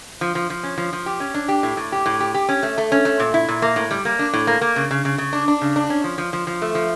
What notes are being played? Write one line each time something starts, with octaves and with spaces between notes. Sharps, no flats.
F3
F3
F3
C#4
F3
F3
G4
C#4
D4
G4
A2
A2
G4
A2
G4
G4
C#4
A3
A3
C#4
A3
A#2
E4
A#2
A#3
A2
G3
A#3
D4
A2
A#3
A#3
C#3
C#3
C#3
C#3
D4
D4
C#3
D4
C#4
F3
F3
F3
F3
A3
F3